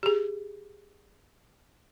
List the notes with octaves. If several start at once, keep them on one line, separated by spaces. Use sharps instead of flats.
G4 G#4